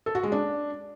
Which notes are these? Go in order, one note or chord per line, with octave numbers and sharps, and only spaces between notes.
A4
F#4
G#3
D4